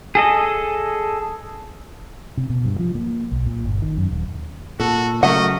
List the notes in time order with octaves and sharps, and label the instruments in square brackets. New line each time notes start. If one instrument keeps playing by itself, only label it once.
[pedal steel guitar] G#4 A4 D#5
[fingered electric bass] C3
B2
G2
F3
A#3
B1
A#2
G1
D#3
F#2
D#1
[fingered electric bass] A#2 [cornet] F#4 [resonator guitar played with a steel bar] A4
[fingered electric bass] C#3 F#3 [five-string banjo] A3 F#5 [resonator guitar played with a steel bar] F#4 A#4 [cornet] D#5